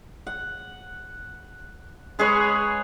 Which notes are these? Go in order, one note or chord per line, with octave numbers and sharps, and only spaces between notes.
F#5
G#3 G#4 B4 C#5